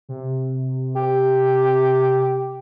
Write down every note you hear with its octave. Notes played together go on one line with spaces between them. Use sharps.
C3
G4